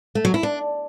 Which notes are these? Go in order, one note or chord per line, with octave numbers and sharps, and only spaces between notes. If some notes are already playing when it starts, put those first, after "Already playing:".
A3
F#3
E4
D4